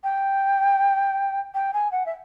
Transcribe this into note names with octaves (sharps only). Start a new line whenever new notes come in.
G5
G5
G#5
F#5
E5